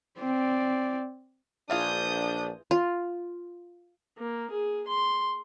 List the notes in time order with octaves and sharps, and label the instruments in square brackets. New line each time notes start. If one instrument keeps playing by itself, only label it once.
[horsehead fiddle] C4 D5
[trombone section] A#1 D4 [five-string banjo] E3 F4 G#4 [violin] D#6 G6
[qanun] F4
[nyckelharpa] A#3
G#4
C6